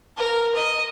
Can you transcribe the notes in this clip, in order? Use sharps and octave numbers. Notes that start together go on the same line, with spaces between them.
A#4
D#5